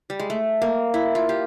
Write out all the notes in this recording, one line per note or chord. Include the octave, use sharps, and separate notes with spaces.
G3
G#3
A3
A#3
E4
F4
G4